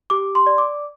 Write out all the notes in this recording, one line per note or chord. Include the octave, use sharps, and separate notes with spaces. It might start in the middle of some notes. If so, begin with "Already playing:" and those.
G4 D6
C6
D5
D6